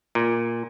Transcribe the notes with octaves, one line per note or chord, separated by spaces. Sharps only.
A#2